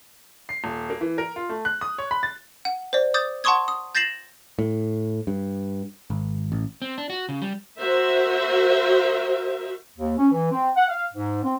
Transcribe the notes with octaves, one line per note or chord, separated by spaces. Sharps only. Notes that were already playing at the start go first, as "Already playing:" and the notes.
C7
D#1
A#3
E3
A#4
F4
A3
F#6
D#6
C#5
B5
A6
F#5
C5 D5
D6 D#6 G6 A6
F#5 A5 C6 C#6 D#6 G#6
D#6
G6 A6 A#6 C7 E7 F#7
A2
G2
G#1
A1
C4
D4
F#4
C#3
G3
F#4 A#4 C5 E5
D#2
C#4
E3
C4
F#5
F5
G#2
C4